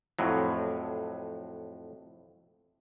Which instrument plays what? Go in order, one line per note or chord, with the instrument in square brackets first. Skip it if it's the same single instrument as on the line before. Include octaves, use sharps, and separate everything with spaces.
[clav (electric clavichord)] F2 A2 F#3